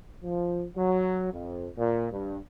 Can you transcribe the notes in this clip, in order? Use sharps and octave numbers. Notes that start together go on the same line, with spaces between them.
F3
F#3
F2
A#2
G2